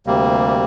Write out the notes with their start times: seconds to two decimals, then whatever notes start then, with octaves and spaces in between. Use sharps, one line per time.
0.07 D2 C3 G3 A#3